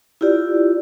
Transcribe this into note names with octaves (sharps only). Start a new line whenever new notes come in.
E4 F4 G4 D5